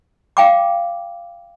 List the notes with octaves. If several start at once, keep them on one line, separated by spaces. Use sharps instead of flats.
F5 G5 D6